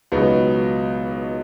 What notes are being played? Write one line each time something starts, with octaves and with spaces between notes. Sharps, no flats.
C#2 B2 F#3 B3 D#4